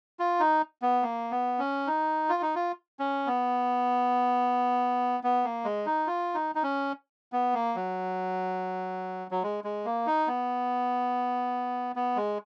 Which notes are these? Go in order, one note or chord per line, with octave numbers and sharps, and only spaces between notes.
F4
D#4
B3
A#3
B3
C#4
D#4
F4
D#4
F4
C#4
B3
B3
A#3
G#3
D#4
F4
D#4
D#4
C#4
B3
A#3
F#3
F#3
G#3
G#3
A#3
D#4
B3
B3
G#3